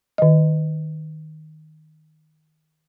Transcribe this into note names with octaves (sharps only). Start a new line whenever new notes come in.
D#3 D#5